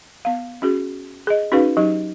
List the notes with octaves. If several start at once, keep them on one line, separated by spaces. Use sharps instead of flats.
B3 F5
C#4 F#4 G#4
G#4 D#5
C#4 D#4 F#4 G#4 B4 F5
F#3 D#4 G4